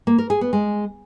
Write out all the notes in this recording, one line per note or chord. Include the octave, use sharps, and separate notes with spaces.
A#3
A#4
G#4
B3
G#3